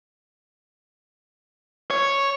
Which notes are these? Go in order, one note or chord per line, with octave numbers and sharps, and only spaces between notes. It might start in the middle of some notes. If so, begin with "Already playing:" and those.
C#5